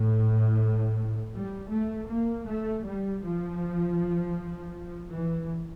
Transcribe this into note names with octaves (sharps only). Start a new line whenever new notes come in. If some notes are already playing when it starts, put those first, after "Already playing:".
Already playing: A2
G3
A3
A#3
A3
G3
F3
E3